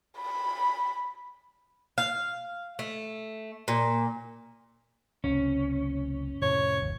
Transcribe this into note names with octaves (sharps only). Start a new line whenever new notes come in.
B5
F5
A3
A#2
F#1 C#2 C3 C#4
F2 A2 C3 C#5
G1 D#2